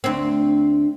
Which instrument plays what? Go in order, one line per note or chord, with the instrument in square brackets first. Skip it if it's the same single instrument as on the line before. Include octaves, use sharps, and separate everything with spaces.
[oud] D2 C4